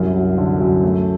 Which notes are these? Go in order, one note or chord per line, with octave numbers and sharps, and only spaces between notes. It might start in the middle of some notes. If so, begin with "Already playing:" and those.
Already playing: C2 F#2
F#3
D3
F#2
A3